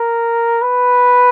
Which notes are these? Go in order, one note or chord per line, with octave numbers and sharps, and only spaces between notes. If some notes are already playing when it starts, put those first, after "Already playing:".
Already playing: A#4
B4